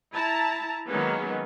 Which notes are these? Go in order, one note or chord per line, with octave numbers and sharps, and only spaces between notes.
E4 A5 A#5
D#3 F#3 G#3 A#3 B3 C#4